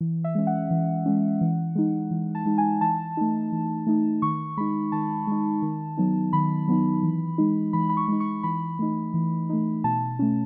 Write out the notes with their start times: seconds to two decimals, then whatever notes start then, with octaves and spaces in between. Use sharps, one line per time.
0.01 E3
0.24 E5
0.35 G#3 C#4
0.47 F#5
0.71 E3
1.06 G#3 C#4
1.41 E3
1.75 G#3 D#4
2.11 E3
2.35 A5
2.46 G#3 D#4
2.58 G#5
2.81 E3 A5
3.17 A3 D#4
3.52 E3
3.87 A3 D#4
4.22 D#3 C#6
4.57 G#3 D#4 B5
4.92 D#3 A5
5.27 G#3 D#4
5.62 D#3
5.97 F#3 B3 D#4
6.33 D#3 B5
6.68 F#3 B3 D#4
7.03 E3
7.38 G#3 D#4
7.73 E3 B5
7.89 B5
7.97 C#6
8.08 G#3 D#4
8.20 C#6
8.43 E3 B5
8.79 A3 D#4
9.14 E3
9.49 A3 D#4
9.84 B2 A5
10.19 A3 C#4